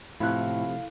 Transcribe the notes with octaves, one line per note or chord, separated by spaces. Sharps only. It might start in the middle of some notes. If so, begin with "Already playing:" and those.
A2 C3 F3 A3 E4 F5 F#6